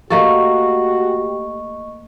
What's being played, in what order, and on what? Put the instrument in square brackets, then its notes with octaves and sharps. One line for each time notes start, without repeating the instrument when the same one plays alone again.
[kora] A3 A#3 A4 [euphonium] F#4 [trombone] G4 [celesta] D#5 C#6